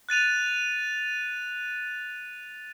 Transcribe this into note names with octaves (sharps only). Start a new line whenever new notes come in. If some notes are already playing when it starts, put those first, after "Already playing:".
F#6 A6 D#7 F7